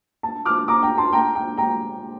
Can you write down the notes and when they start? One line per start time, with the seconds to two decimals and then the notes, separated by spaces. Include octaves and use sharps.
0.23 A5
0.45 D6 F6
0.68 A#5 D6
0.83 G5 A#5
0.98 A5 C6
1.13 G5 A#5
1.35 G5
1.57 G5 A#5